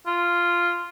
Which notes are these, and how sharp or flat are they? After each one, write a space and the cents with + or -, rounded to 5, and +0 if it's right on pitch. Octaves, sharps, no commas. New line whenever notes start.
F4 -5